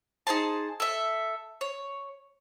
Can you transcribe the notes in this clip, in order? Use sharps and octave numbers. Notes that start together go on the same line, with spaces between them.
D#4 G#4 C5 A5
A4 E5
C#5